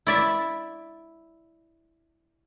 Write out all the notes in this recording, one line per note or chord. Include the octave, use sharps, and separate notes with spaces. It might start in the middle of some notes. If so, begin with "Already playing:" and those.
E4 D5 E5